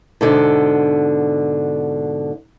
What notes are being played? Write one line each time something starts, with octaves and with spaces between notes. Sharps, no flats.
G#2 B2 D3